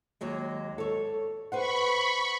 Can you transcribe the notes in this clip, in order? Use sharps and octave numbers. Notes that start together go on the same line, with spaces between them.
D#2 F#3 G#3
A4 C#5
B4 C5 F#5 B5 C#6